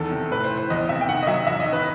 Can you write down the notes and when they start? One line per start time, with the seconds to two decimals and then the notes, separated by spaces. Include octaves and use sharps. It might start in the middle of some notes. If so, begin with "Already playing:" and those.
Already playing: E2 D#3 A4
0.11 C3
0.31 A2 B4
0.44 C5
0.50 E3
0.58 C5
0.70 E2 D#5
0.89 C3 E5
1.01 G5
1.09 D#3 F#5
1.23 D#5
1.27 F#3 E5
1.47 E2 E5
1.60 D#5
1.66 D#3
1.73 B4